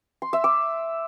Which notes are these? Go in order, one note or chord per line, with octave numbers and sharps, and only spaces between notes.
C6
E5
D6